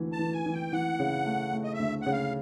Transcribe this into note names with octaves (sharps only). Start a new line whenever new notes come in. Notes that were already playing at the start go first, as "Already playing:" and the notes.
Already playing: D2 E3 A3
A5
E3
G#5
E3
G5
E3 F#5
C#3
A3
A3
D#5
E5
D2
C#3 F#5
F5